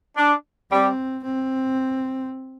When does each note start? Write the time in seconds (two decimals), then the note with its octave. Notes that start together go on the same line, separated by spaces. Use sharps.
0.16 D4
0.71 G3 C4
1.24 C4